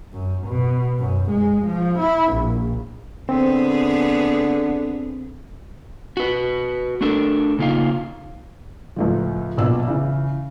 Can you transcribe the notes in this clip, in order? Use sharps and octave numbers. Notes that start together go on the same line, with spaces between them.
F#2
B2
F#2
G#3
F3
E4
A#1
D3 B3 C4 G#4
F#4 B4
A3 D4 A4 A#4
C#3 A#3 D#4 F4 F5
C#2 A2 F3
A#1 B2 E6
C#3 E3